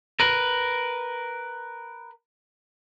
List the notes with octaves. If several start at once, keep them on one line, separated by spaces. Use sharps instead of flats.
A#4 B4